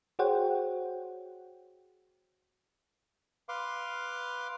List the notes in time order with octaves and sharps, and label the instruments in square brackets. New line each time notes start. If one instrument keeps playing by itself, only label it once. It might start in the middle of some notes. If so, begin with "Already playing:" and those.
[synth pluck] F#4 G#4 C5 C#5 F#5 G5
[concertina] B4 F5 C6 D6